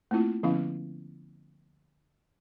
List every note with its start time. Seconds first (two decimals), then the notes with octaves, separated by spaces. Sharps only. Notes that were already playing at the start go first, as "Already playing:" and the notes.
0.11 A3 A#3 C4 E4 F4
0.43 D3 F3 B3 C#4 E4 F5